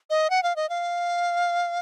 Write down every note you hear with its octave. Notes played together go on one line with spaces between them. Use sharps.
D#5
F#5
F5
D#5
F5